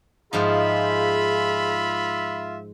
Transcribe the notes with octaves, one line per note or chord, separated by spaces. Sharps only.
G#2 F3 D#4 F4 G#4 E5 B5